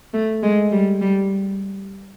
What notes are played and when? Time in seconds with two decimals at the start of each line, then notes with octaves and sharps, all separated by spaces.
0.13 A3
0.43 G#3
0.72 G3
1.01 G3